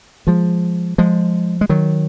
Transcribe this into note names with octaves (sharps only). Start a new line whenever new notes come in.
F3 G#3
F3 G#3
G#3
D#3 F#3